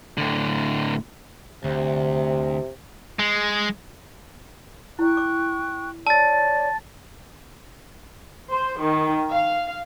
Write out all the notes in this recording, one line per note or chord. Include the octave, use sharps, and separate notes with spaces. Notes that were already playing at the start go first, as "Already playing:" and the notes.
A2 D3
D2 C3
G#3
E4 G5 C#6 F#6
D6
C#5 D5 A5 E6 A6
C5
D#3
F5